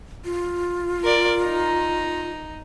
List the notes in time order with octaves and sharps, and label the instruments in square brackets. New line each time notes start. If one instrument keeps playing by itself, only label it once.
[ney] F4
[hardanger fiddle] A#4 D5
D#4 A#5